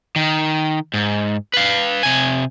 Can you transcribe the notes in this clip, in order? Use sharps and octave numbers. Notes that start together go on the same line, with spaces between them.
D#3
G#2
B4 F5
C3 G#5